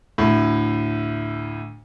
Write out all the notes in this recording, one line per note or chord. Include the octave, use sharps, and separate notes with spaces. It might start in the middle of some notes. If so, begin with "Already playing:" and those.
D2 A2